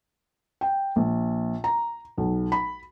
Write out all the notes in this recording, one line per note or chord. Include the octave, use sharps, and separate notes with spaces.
G5
A#1
A#5
B1
B5